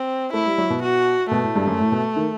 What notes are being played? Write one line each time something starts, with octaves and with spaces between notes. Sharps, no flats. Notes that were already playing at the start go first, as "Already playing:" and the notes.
Already playing: C4
A3 E4
G3
F#3
B2
F#4
B2 A3
A2
G2
F#2
A2
B2
D#3